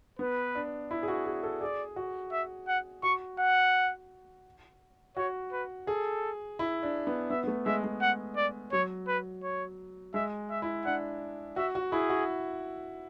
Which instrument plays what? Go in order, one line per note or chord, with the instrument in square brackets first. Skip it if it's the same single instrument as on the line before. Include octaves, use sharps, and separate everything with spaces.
[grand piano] B3 [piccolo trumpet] B4
[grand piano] D4
E4
G#4
F#4
G#4
A4
[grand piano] G#4 [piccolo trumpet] D5
[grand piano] F#4
[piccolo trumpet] E5
F#5
[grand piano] F#4 [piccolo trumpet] C#6
[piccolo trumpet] F#5
[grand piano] F#4 [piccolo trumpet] C#5
[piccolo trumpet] B4
[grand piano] G#4 [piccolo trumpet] A4
[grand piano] E4
D4
B3
[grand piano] B3 [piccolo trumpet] E5
[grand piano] B3
A3
[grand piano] G#3 [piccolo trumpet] E5
[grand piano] G#3
[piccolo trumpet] F#5
D5
[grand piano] F#3 [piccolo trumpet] C#5
[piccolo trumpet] B4
C#5
[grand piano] G#3 [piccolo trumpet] E5
[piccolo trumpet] E5
[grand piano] E4
[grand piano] D4 [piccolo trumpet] F#5
[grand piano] F#4 [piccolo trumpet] E5
[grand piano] F#4
[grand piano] E4 [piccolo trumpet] G#4
[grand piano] F#4